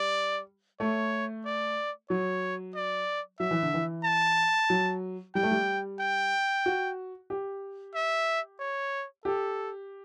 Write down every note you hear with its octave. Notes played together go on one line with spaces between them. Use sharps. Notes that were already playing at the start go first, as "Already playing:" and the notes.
Already playing: G3 D5
A3 C#5
D5
F#3 C#5
D5
F#3 E5
E3
D3
E3
A5
F#3
G3 G5
A3
G3
G5
F#4
G4
E5
C#5
G4 A4